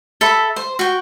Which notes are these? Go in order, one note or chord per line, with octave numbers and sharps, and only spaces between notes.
A4 E5 B5
C5
F#4 G5